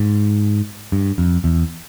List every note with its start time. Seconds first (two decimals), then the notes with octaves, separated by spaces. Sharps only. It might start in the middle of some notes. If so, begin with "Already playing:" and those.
Already playing: G#2
0.92 G2
1.18 F2
1.44 E2